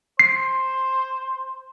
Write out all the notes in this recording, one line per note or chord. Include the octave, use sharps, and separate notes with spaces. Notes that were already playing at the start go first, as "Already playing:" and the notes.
C5 C7